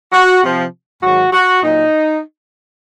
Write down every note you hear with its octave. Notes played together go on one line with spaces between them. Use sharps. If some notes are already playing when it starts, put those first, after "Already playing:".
F#4
C3 F3
G#2 D#3 F#3 F#4
F#4
A#2 F#3 D#4